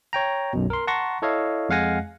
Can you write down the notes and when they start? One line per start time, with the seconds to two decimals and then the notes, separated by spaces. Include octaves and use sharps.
0.13 C#5 G5 A#5
0.53 B1 F#2 B2
0.70 A#4 C6
0.87 F#5 A5 A#5 C6 C#6 A#6
1.22 E4 A4 C#5 D#5 F5
1.69 F2 G#3 F5 F#5 G#5 A#6